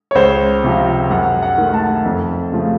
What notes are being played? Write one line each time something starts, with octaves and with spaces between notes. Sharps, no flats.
C#5
C#2 C5
C3 F3
F#2 F#5
F#5
D#3 A3
F#5
A5
F2
C#3 F3 A3